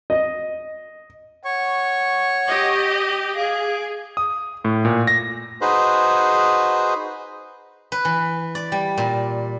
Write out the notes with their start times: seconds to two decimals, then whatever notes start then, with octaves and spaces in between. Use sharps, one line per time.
0.10 D#5
1.45 C#5 F#5 C#6
2.47 G4 D#5
3.36 G#4 F5 D6
4.17 D#6
4.65 A2
4.85 A#2
5.07 A#6
5.61 D#4 F#4 G#4 B4 C5
7.92 B4
8.05 E3
8.55 D5
8.72 G3
8.98 A#2